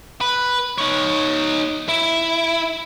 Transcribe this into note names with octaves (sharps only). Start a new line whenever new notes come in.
B4
D#4 C#5
E4